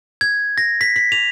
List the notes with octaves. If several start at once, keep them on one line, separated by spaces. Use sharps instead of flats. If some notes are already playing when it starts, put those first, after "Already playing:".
G#6
A#6
B6
B6
F7